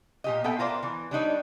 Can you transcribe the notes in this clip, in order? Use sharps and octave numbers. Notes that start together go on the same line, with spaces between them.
A#2 G4 D#5
B3 A4 A#4 E5 G5
F4 A#4 C5 D5
E3
G3 D4 D#4 C#5